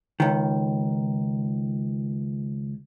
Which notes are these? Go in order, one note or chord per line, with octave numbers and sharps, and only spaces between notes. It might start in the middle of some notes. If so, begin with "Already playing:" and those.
C#2 D#3